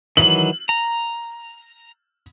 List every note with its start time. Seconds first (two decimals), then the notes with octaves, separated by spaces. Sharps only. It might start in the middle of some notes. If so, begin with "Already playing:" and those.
0.17 D#3 E3 F#3 F#7
0.69 A#5